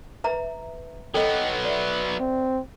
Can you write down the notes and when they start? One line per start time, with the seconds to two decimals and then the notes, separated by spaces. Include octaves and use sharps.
0.24 B4 E5 A#5
1.14 F#3 B3 A4 D#5 G5
1.65 D5 E5
2.20 C4